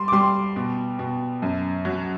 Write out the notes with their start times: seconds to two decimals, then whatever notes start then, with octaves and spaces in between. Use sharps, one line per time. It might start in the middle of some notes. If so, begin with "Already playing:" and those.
Already playing: G3 C6
0.08 D6
0.12 G3 C6
0.56 B2
0.99 B2
1.42 F#2
1.85 F#3